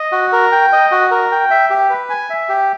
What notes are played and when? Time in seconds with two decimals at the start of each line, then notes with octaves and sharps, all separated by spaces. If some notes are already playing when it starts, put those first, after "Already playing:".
Already playing: D#5
0.12 F#4
0.32 A#4
0.52 G5
0.72 D#5
0.91 F#4
1.11 A#4
1.32 G5
1.50 E5
1.70 G4
1.90 B4
2.10 G#5
2.30 E5
2.49 G4